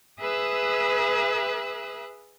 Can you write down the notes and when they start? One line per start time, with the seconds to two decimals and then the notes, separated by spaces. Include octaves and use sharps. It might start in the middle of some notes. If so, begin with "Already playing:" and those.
0.20 G#4 B4 E5 D#6 E6 F#6